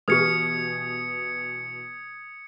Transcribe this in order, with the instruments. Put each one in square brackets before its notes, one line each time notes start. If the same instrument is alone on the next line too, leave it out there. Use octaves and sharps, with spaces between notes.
[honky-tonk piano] B2 E3 [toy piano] G4 B4 [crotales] D#6 G#6 C#7